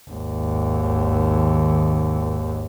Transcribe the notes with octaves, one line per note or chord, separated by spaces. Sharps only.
G#1 D#2